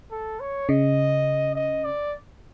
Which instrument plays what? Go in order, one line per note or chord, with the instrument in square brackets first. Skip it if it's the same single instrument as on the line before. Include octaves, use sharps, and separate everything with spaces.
[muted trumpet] A4
C#5
[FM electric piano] C#3 [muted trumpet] D#5
[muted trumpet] D#5
D5